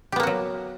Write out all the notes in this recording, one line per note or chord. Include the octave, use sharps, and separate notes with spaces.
F#3 A#3 B3 F#4 G4